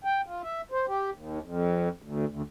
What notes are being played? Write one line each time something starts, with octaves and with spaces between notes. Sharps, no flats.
G5
F4
E5
C5
G4
D#2
F2
D2
D2